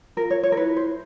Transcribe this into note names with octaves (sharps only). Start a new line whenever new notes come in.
F4 A#4
C#5
C#5
A#4
E4 B4
C5